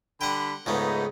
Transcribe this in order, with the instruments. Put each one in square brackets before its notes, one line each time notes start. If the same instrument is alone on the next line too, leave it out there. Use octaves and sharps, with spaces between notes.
[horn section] D3 G3 B5 [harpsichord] F#5 G5
[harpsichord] C#2 G#2 A3 [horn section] B3 D#4